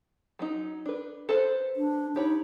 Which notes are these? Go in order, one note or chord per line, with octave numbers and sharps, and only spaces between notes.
F#3 C#4 D#4
D4 B4
A4 B4 C5
D4
D#4 G4 C#5 B5